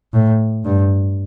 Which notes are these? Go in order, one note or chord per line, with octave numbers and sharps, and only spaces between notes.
A2
G2